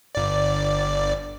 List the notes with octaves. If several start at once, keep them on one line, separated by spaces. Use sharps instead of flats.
G1 D5